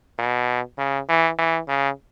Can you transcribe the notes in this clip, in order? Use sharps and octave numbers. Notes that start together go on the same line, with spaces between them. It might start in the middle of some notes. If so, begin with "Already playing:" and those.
B2
C#3
E3
E3
C#3